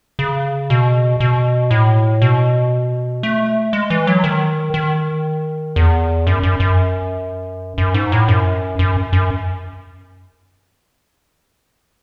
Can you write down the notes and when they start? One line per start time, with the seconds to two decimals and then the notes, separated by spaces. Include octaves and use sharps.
0.19 C#3
0.70 B2
1.20 B2
1.71 A2
2.22 B2
3.23 A3
3.73 G#3
3.90 E3
4.07 F#3
4.24 D#3
4.74 D#3
5.76 E2
6.27 F#2
6.43 F#2
6.60 F#2
7.78 F#2
7.94 G#2
8.12 A2
8.28 F#2
8.79 F#2
9.13 F#2